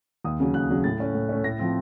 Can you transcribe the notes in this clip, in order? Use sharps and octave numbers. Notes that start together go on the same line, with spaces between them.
D#2 D#6
C#3 F#3
D#2 F#6
C#3 F#3
A2 A6
A3 C#4
A2
A3 C#4
A2 A#6
F3 C4